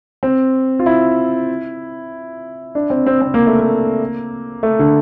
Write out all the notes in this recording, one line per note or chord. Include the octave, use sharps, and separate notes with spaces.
C4
F4
E4
D4
C4
C4
C4
A#3
A3
A#3
A3
D3